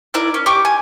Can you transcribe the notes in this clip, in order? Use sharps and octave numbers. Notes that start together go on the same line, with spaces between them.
E4 A#4 D5 F#6
C#4
G4 C#6 D6
G#5